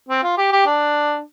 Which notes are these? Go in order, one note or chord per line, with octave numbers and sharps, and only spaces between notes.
C4
F4
G4
G4
D4